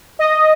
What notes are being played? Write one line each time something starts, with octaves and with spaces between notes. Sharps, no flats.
D#5